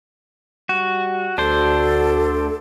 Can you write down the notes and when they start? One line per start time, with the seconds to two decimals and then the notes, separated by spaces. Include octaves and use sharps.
0.69 G3 F#4
1.38 D2 D4 F#4 A4 C5